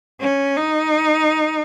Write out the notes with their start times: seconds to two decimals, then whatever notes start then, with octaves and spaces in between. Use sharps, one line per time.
0.20 C#4
0.56 D#4